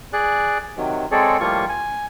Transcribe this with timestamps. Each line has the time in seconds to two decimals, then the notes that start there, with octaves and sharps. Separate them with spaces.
0.13 G#4 D5 F#6
0.77 C3 D#3 F#3
1.11 G#3 C4 G#4 A4 C#5 D5
1.40 A2 F3 G3 A#3 F4 C#6
1.69 G#5